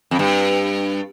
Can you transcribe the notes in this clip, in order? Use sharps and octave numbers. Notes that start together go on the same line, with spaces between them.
F2
G2